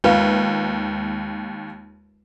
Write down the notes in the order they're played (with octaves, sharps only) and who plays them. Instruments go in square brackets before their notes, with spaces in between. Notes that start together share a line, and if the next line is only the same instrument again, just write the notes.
[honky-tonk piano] D#2 [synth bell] G#3 [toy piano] F4 B4 F5